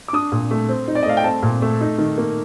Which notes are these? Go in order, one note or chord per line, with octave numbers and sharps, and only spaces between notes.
D6
D4 D#6
A#2
A3
C4
D#4
D5
D#5
A3 F5
G5
C4 A5
A#2
A3
D#4
D#3
A#3